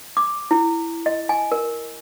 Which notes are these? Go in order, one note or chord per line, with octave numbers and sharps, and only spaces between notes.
D6
E4
D#5
G#5
A#4